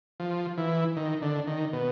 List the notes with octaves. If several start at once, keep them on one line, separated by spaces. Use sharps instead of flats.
F3
E3
D#3
D3
D#3
B2